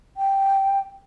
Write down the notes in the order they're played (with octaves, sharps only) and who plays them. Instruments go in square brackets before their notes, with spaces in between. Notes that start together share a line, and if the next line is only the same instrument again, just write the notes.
[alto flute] G5